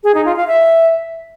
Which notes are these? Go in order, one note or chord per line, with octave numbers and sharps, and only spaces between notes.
G#4
D#4
F4
F5
E5